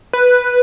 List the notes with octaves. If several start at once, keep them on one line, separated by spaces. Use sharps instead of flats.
B4